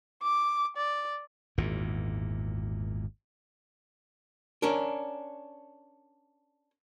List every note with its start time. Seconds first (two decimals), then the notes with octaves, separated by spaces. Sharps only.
0.23 D6
0.77 D5
1.58 G#1 E2 A#2
4.62 C#4 D4 A#4